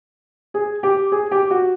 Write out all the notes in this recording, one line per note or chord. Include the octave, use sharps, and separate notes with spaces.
G#4
G4
G#4
G4
F#4